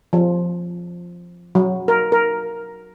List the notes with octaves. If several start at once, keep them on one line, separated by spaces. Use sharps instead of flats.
F3
F#3
A#4
A#4